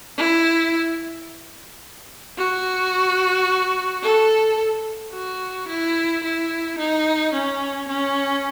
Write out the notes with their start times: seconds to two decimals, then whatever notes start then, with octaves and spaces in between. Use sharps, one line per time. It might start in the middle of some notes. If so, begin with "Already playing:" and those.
0.18 E4
2.38 F#4
4.03 A4
5.12 F#4
5.68 E4
6.23 E4
6.78 D#4
7.33 C#4
7.88 C#4